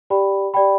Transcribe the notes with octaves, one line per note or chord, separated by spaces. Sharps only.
G4 D5 G5 B5
G4 D5 G5 B5